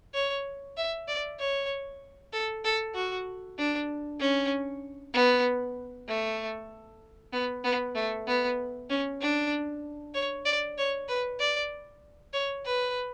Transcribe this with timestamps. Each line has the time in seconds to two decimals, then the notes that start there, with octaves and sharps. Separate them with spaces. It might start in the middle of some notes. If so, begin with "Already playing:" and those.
0.14 C#5
0.77 E5
1.08 D5
1.39 C#5
2.33 A4
2.65 A4
2.95 F#4
3.58 D4
4.20 C#4
5.14 B3
6.08 A3
7.33 B3
7.64 B3
7.95 A3
8.28 B3
8.90 C#4
9.21 D4
10.14 C#5
10.45 D5
10.78 C#5
11.08 B4
11.40 D5
12.33 C#5
12.65 B4